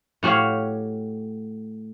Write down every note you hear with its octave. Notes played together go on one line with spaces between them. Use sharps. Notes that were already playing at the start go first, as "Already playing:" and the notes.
A2 F#4 G4 C#5 F5